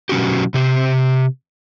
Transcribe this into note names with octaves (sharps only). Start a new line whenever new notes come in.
B2 F#3 C#4 F#4 G4
C3 G4